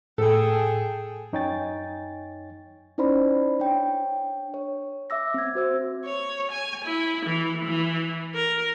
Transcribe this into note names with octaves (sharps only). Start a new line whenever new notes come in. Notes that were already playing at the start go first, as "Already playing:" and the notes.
A2 G#4 A4 G5 G#5
F#2 D#4 C#5 G5 G#5 A6
C#4 D#4 E4 C5 D5 B5
D4 C#5 G5
C#5
E5 D6 E6 A#6
C4 G#6
F#4 C5 E6
C#5
G#5
E4
E3
E3
A#4